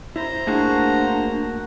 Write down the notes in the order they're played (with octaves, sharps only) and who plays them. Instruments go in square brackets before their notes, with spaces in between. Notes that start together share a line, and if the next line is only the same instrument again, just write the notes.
[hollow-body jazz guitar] E4 [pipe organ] C5 A#5
[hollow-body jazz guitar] A3 G#4 A5 [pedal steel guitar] A#3 F#4 [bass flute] D4